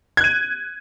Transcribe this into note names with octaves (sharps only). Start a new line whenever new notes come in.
F#6 G#6 D#7